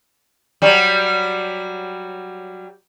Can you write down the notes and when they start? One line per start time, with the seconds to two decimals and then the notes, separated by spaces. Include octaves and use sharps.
0.62 F#3 G3